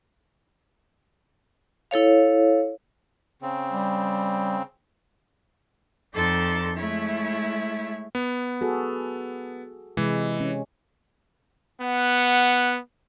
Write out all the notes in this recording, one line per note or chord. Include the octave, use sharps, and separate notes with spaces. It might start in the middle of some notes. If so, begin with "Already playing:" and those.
E4 A4 C#5 F5
C#3 C4
G3
F2 D#4 A4 D5 C6 A6
G#3 A3 E4 C#5
B3
F#4 G#4 A4
C3 E3 G#3
C#4
B3 F#5